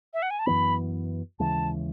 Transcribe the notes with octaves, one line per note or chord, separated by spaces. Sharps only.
E5
F#5
G#5
A5
F#2 E3 B3 B5
D#2 C#3 E3 G#3 A5